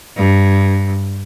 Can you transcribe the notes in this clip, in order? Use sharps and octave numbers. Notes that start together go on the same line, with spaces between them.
G2